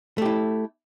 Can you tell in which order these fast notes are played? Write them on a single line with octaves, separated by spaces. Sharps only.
A3 G4 E4